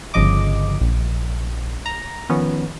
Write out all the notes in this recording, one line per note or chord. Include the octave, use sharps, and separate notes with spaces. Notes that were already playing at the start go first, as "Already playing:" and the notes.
G1 C#3 F3 D#5 D6
A#1
A#5
D#3 F3 B3 C#4